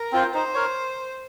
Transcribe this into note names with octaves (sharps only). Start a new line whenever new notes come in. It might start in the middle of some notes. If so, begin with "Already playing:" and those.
Already playing: A#4
C4 F4 C5
D#4 C5
A#4 C#5